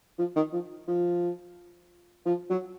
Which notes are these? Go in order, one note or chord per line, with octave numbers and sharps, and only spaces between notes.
F3
D#3
F3
F3
F3
F#3